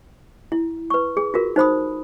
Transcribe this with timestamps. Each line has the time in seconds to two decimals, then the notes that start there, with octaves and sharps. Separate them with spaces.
0.52 E4
0.90 B4 C#6
1.17 G#4
1.34 F4 F#4 A#4
1.56 D#4 C5 B5 D#6